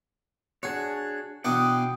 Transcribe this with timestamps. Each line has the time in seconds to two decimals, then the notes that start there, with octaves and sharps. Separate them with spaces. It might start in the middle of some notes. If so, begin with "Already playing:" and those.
0.63 D4 F#4 G#4 C#5
1.44 B2 E3 D4 F#5 G5 D#6